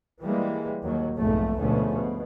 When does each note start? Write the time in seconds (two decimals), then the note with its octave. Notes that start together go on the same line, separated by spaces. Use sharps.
0.20 E3 G3 G#3 A#3
0.83 D#2 F#3
1.16 B1 F2 G#2 A3
1.58 D2 G#2 B2 F3 A3 C#4
1.93 B2